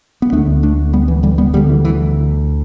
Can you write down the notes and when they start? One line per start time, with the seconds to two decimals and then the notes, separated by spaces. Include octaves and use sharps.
0.22 B3
0.32 D2 A3 D4
0.38 D3
0.63 A3 D4
0.93 G3 B3
1.08 E3
1.23 D3 G3
1.38 G3 B3
1.53 D2 G3 B3
1.57 D3
1.69 E3
1.85 E3